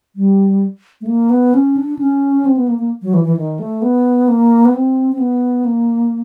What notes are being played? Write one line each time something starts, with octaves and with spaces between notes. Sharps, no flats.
G3
A3
A#3
B3
C#4
D4
C#4
C4
B3
A#3
A#3
F#3
E3
E3
D#3
A3
B3
A#3
B3
C4
C4
B3
A#3